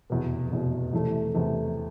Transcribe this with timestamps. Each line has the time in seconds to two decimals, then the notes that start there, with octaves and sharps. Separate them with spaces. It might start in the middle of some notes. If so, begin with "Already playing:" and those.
0.10 F1 E2 B2
0.51 F1 E2 B2
0.93 E2 C3 E3 A3 E4
1.34 E2 C3 E3 A3 E4